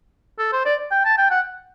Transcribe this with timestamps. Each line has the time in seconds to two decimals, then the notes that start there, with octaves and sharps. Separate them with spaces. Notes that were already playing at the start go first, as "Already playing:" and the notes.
0.39 A4
0.52 C5
0.66 D5
0.91 G5
1.05 A5
1.18 G5
1.31 F#5